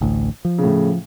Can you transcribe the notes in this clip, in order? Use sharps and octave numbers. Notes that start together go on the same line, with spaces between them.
A1 D2 A2
F3
A2 C#3